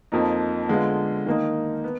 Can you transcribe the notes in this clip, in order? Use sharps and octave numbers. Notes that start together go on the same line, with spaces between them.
F2 F3 A#3 D#4
D3 G#3 B3 F4
D#3 A#3 D#4
B3